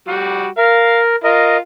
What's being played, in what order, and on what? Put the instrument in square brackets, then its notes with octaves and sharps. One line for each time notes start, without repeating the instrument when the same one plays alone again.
[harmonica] G3 F#4
[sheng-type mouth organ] A#4 [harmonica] F5
[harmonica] F4 [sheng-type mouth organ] A#4 D#5